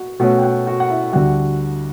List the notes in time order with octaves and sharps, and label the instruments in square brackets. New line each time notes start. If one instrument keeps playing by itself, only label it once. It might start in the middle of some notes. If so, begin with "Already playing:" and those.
Already playing: [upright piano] F#4 F#5
[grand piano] B2 A3 C#4 [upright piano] F#4 F#5
[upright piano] G5
F#4 F#5
F#4 F#5
F#5
E4 E5
[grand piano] D2 D3 G3 [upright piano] F#4 F#5